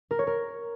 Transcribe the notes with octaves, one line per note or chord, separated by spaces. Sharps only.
A#4
C#5
A#4